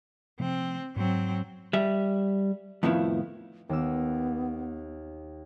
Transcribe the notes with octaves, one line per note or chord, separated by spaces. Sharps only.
C3 F3 A3 C4
G#2 F#3 C4
G3 E5
F2 A2 D#3 F3 B3 E4
D#2 B3 E6